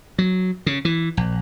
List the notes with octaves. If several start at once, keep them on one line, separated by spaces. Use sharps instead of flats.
F#3
C#3
E3
A#1